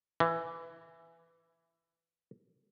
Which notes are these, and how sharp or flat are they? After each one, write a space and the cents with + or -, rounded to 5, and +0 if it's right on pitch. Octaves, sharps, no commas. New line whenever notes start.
E3 +10